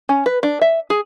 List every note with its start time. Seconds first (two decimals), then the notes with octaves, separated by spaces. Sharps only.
0.09 C#4
0.26 B4
0.43 D4
0.62 E5
0.90 G#4